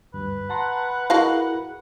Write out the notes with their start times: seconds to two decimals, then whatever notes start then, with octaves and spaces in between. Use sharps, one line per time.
0.14 D2 G2 B4
0.50 F#5 A5 A#5 C6
1.10 E4 F#4 G#4 A#4 D#5 F5